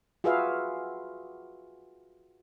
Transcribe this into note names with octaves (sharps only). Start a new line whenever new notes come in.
F4 F#4 G#4 B4 E5 F5